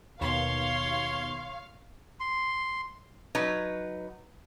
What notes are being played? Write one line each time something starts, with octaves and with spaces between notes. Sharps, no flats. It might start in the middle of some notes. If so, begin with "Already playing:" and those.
D#2 B2 C#5 F5 C6
C6
F#3 D#4 B4